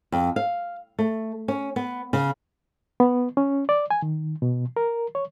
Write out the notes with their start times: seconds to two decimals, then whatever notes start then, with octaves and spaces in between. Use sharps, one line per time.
0.12 F2
0.36 F5
0.99 A3
1.48 C#4
1.76 B3
2.13 C#3
3.00 B3
3.37 C#4
3.69 D5
3.91 G#5
4.02 D#3
4.42 B2
4.77 A#4
5.15 C#5